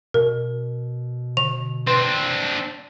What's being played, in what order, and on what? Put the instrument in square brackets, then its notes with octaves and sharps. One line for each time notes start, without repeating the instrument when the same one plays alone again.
[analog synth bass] B2 [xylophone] A#4
[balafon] D3 [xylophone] F7
[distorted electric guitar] C4 D4 [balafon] B4 [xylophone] C6